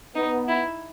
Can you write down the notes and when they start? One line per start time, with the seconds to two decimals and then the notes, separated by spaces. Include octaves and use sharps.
0.15 B3 D#4
0.48 E4